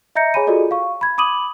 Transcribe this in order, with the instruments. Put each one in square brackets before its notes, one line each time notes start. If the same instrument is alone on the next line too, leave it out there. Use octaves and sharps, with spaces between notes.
[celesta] D#5 E5 A#5 G6 A#6 C#7
G#4 C#5 G#5 B5 D#7
F4 F#4 G#4 A4 D5 D#5
F5 C#6
B5 G#6
B5 D6 D#6 D#7 F#7